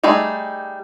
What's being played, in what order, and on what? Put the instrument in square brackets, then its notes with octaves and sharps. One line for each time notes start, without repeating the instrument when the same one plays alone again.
[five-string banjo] G3 A3 D#4 G#4